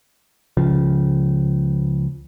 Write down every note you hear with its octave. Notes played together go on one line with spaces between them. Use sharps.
C#2 C#3 F3